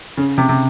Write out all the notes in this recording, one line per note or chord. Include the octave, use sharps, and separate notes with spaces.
C#3
C3
C3